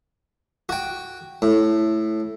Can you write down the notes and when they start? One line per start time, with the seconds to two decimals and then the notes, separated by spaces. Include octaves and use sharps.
0.69 F#4 G5
1.42 A2